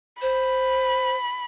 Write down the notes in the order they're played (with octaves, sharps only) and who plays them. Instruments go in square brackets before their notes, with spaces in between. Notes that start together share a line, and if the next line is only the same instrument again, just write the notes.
[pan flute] C5 [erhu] B5